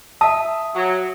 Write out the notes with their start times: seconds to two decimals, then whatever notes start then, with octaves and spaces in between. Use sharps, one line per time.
0.21 E5 A5 D#6
0.75 F#3